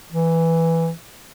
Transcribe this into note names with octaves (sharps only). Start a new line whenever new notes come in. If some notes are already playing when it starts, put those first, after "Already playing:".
E3